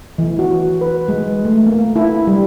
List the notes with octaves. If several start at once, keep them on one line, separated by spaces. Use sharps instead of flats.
E3
F#4
B4
G#3
A3
A#3
E4
G3